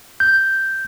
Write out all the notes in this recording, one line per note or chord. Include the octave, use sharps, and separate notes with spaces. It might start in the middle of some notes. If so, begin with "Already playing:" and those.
G6